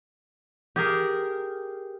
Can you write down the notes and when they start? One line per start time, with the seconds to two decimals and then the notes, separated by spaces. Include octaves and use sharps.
0.76 G4 G#4 A#4